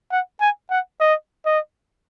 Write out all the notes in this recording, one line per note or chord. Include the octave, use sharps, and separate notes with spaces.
F#5
G#5
F#5
D#5
D#5